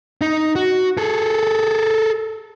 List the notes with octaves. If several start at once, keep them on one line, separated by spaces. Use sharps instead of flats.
D#4
F#4
G#4 A4